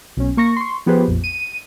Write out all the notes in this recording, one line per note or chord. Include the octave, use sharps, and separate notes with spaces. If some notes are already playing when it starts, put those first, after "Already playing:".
B1 C#4
A#3 C#6 A#6
C6 C#6
F3 B3 G4 G#4 B4 C5
A#1 F2
D#7